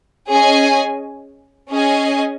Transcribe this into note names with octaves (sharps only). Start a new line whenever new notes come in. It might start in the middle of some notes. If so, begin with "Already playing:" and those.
C#4 G#4 D#5 G#5
C#4 G#4 D#5 G#5